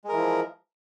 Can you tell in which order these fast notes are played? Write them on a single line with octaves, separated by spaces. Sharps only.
G#3 A#4 E3 F3